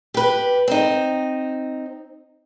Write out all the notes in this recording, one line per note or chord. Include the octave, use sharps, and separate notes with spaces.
G4 B4
C4 D#4